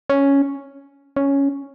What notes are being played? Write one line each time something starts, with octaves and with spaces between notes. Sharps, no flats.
C#4
C#4